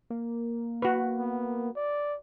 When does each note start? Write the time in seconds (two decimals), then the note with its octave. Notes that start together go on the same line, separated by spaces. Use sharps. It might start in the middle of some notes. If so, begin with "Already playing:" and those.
0.10 A#3
0.82 F#4 B4
1.19 B3
1.76 D5